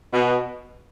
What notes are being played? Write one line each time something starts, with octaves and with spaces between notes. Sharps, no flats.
B2